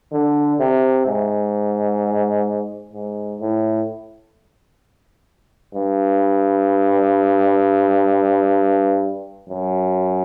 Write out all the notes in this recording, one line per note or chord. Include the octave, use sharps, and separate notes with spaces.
D3
C3
G#2
G#2
A2
G2
F#2